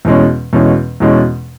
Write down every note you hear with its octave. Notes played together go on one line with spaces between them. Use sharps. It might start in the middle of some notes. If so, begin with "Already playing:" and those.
E2 B2 G#3 C#4
E2 B2 G#3 C#4
E2 B2 G#3 C#4